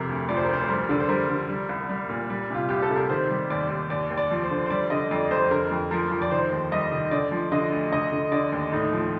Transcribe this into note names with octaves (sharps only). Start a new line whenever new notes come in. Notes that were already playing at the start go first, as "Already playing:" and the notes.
Already playing: F2 C3 A#4
D2
F3 D5
C5
A#4
D2 C5
C5
G3 A#4
D3 D5
C5
G3 A#4
D3
G3
C2
G3
A#2
G3
C3 F4
C2 G4
A4
C3
A#4
D#3 C5
G3
D#2 D5
D#2
D#2 D5
D#2
D5
F3
C5
D3
C5
G3 D5
D3 D#5
F2 D5
F2 C5
D3 A#4
F2
F3 A#4
F3
D5
D#3 C5
D#2
G3 D#5
D#3
D3 D5
F3
D3 D#5
D2
D3 D#5
D3
D3 D5
D#2
A2 D#4
F3